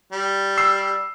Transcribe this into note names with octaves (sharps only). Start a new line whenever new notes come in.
G3
E6 C7